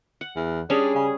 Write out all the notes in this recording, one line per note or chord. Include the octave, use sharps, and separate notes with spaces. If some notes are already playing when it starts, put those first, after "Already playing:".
F#5
E2
G3 C#4 D4 G#4
C#3